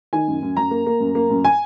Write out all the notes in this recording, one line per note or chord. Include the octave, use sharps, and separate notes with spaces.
D#3 G#5
F#2
F#2
F#2 A#5
A#3
A#3
F#2
A#3
F#2
G#5